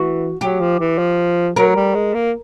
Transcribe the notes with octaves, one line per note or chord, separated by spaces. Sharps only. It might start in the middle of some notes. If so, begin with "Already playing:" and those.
Already playing: E3 F#4
F#3 G4
F3
E3
F3
F#3 A#4
G3
G#3
A#3